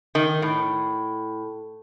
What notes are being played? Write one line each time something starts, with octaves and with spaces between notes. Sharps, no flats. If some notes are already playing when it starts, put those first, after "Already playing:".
D#3
A2